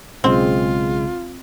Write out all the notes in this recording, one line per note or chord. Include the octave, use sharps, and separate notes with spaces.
B1 C#3 G#3 C4 F4